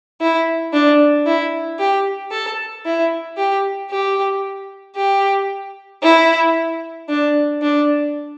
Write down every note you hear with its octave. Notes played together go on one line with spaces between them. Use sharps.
E4
D4
E4
G4
A4
E4
G4
G4
G4
E4
D4
D4